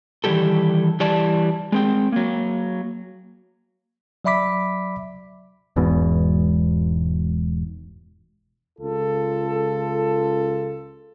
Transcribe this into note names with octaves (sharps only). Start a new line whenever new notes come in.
D#3 E3 G3 G4 A4
E3 G3 G4 D5 A5
G#3 C4 G5
F#3 A#3
F#3 D5 E5 B5 D6 B6
E1 E2 G#2 B2
C#2 F4 A4